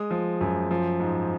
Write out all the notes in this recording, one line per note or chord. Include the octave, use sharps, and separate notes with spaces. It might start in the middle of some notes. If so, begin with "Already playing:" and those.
Already playing: G#3 D#6
F3
F#2
F3
G#2